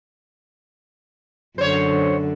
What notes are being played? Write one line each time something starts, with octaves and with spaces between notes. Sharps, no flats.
F#2 D3 C5 C#5